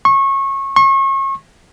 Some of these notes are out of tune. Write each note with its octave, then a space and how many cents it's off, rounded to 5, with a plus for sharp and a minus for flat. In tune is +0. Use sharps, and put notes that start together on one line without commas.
C#6 -25
C#6 -35